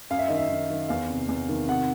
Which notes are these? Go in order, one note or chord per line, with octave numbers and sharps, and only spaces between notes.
F#2 F5
E5
D#3 D#5
E5
D#3
D#3
E2 F5
C3
E2
D#3
C3 F#5